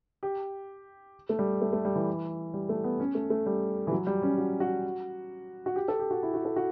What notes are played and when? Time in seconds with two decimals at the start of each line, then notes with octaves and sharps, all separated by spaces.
0.23 G4
1.29 A3
1.39 G3
1.61 A3
1.73 A3
1.85 G3
1.95 E3
2.54 G3
2.69 A3
2.84 B3
3.00 C#4
3.15 A3
3.30 A3
3.46 G3
3.87 E3
3.91 F#3
4.07 G3
4.22 C#4
4.38 F#4
4.60 F#4
5.66 F#4
5.76 G4
5.88 A4
5.99 G4
6.11 F#4
6.23 E4
6.34 F#4
6.45 A4
6.56 F#4